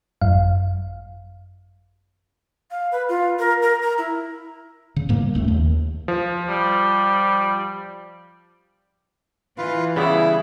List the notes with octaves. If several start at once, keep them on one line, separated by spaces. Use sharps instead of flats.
G#1 F#2 F5
F5
B4
F4
A#4
A#4
A#5
E4
C#3
G#2 G3 A#3
E1 C#2 B2 A3
D#2
F3
G3
E3 F4 B4 F5
C#3 G3 B3 E4 G#4 C#5